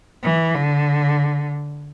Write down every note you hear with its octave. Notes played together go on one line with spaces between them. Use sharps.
E3
D3